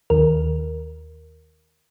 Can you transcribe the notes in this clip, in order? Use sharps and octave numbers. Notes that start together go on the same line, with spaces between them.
D#2 D#3 A#4